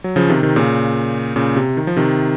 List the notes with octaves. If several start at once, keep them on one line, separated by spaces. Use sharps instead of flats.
F#3
C#3 F3
C3 D#3
C3 D#3
A#2 C#3
A#2 C#3
C3
D#3
F3
C3 D#3